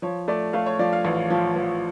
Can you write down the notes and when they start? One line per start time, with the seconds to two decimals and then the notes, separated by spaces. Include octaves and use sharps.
0.02 F3 C#5
0.28 A3 D5
0.53 A3 F5
0.66 C#5
0.79 F3 D5
0.93 F5
1.05 A1
1.30 F3
1.56 F3